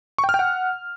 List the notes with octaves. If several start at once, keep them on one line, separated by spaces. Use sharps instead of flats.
C#6
G5
F6
G5
F#5